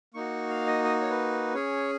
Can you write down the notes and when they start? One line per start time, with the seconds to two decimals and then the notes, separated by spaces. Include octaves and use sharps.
0.14 A#3 D#4 F#4 C#6
0.50 F5
0.67 D#5
0.84 D#5
1.01 C#5
1.10 B4
1.54 C#4 G#4 C#5